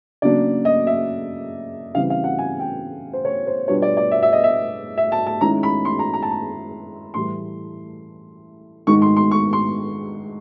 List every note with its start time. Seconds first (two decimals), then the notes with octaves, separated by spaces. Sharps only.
0.22 C#3 F#3 A#3 D4 D5
0.65 D#5
0.87 E5
1.95 C#3 E3 G3 C4 F5
2.10 F5
2.24 F#5
2.38 G#5
2.60 G5
3.13 C5
3.25 C#5
3.47 C5
3.68 B2 G3 B3 D4 F4 C#5
3.82 D5
3.97 D5
4.11 E5
4.22 E5
4.33 D#5
4.44 E5
4.98 E5
5.12 A5
5.26 A5
5.41 D#3 G#3 C#4 E4 A#5
5.63 B5
5.85 C6
5.99 A#5
6.13 A#5
6.23 A5
6.31 A#5
7.14 A2 E3 G3 C6
8.87 G#2 D#3 G#3 C#6
9.02 C6
9.16 C6
9.31 C#6
9.53 C6